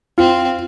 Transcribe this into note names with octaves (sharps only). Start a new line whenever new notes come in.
C4 F4